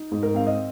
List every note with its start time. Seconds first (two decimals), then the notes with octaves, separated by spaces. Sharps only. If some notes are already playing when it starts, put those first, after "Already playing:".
Already playing: D#4
0.12 G#2
0.23 A#4
0.34 C4 F5
0.47 D#5